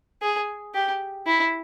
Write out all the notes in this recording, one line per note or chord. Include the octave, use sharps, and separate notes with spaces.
G#4
G4
E4